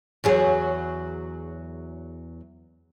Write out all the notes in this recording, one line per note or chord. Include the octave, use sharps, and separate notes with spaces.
E2 F#3 G#4